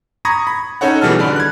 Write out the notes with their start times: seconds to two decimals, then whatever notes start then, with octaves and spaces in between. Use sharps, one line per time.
0.25 A#5 B5 C#6 D#6 G#6 A#6
0.47 B5
0.81 C#4 D#4 A4 C#5 F#5
1.01 B2 E3 G3 G#4 A5 F6
1.19 D3 D5 B5
1.36 F#6 G#6